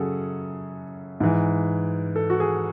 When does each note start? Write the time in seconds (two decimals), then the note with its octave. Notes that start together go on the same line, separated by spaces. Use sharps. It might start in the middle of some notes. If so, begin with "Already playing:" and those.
Already playing: F#2 C#3 F#3 G#4 A4 F#5
1.20 G#2 E3
2.16 A4
2.30 F#4
2.40 G#4